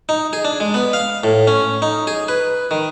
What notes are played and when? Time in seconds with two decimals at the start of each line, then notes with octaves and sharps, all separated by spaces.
0.09 D#4
0.33 G#4
0.45 D4
0.60 G#3
0.74 B3
0.93 F5
1.24 A2
1.47 C#4
1.82 D#4
2.07 G#4
2.28 B4
2.71 D#3